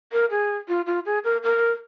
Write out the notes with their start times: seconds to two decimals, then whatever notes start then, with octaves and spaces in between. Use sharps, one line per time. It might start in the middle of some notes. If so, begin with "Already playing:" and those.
0.12 A#4
0.31 G#4
0.68 F4
0.86 F4
1.06 G#4
1.24 A#4
1.43 A#4